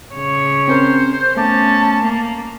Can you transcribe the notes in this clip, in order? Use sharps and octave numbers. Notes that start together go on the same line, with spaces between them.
C#3 C#5
C4 C#4 A#4 C5
A3 B3 C#4 A5 D6
A#3